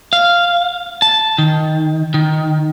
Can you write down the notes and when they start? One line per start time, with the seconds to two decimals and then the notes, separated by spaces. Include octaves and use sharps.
0.13 F5
1.02 A5
1.38 D#3
2.14 D#3